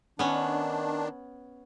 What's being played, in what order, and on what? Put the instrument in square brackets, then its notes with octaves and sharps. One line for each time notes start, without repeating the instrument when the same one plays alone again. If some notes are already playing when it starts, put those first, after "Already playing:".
[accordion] D#3 D4 [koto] B3 C#4